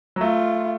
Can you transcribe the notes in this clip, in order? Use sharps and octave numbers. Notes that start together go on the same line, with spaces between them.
F#3
A3 F4